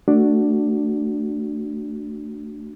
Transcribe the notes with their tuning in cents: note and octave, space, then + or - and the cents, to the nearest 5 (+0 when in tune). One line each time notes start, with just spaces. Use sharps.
A3 +15 D4 +5 F#4 +5